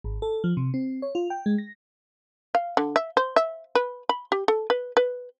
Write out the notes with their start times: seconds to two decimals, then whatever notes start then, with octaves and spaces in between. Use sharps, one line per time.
0.04 G#1
0.22 A4
0.44 F3
0.57 C3
0.74 C4
1.02 C#5
1.15 F4
1.30 G5
1.46 G#3
1.58 A#6
2.55 F5
2.77 D3
2.96 E5
3.17 C5
3.36 E5
3.75 B4
4.09 B5
4.32 G4
4.48 A4
4.70 B4
4.97 B4